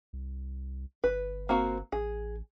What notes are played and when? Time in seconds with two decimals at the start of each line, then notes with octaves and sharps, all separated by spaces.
0.13 C2
1.04 G1 B4
1.49 A#3 C4 F#4
1.92 A1 G#4